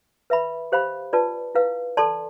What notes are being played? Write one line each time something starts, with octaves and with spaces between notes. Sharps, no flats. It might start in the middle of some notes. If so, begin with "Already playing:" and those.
B4 E5 B5
G4 C5 F5 B5
F4 B4 D5 A5
E4 B4 F5
A4 D5 A5 C6